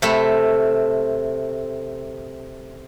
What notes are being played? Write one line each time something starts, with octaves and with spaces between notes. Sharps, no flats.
C3 A3 B5